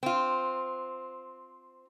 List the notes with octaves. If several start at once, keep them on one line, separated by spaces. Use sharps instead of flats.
C4 F4